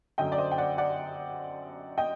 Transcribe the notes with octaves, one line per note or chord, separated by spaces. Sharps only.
F#2 D3 F#3 D#5 G5
D5
C5 D#5
G5
D5 F#5
D5 F#5
D#5 G5